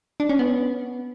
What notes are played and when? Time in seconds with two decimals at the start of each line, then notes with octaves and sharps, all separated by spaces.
0.20 D4
0.29 C#4
0.39 B3